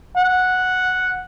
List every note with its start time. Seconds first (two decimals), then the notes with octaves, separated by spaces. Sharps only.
0.16 F#5